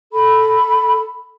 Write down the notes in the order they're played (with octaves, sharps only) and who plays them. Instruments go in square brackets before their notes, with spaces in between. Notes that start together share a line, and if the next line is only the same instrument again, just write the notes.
[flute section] A4 B5